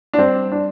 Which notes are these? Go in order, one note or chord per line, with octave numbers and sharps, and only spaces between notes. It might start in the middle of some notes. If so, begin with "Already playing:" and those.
D4
G3 C4
D4